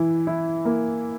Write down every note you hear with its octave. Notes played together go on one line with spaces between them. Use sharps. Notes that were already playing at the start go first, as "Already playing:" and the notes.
Already playing: E3 E4
E4
A#3